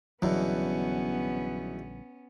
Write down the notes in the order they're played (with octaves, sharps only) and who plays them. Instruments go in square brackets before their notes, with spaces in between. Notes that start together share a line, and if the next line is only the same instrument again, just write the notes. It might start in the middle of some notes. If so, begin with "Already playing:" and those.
[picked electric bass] A#1 D3 G3 [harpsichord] E2 B2 [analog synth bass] F#3 [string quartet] B3 C#4